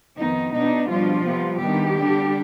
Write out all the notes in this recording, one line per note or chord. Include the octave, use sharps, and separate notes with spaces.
F2 D#3 B3 D#4
B2 B3 D4 D#4
B2 F3 G3 D4 F4
C3 G3 B3
C3 D#3 G3 B3 D4 G4
D3 G3 D4